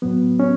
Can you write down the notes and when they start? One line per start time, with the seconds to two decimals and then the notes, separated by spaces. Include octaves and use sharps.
0.02 A2 F#3 B3
0.40 C#4